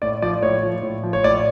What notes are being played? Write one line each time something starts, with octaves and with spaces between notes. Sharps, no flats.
A2 D5
F3 D5
A2 C#5
F3
A2
F3
C#5
A2 D5